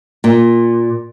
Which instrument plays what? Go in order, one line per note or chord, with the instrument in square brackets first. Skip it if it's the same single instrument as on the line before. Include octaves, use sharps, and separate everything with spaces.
[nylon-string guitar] A#2